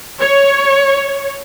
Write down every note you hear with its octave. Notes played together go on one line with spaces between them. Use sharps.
C#5